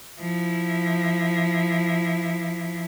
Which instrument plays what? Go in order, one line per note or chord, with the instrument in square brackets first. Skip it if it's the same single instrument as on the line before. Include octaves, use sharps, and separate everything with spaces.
[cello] F3 E4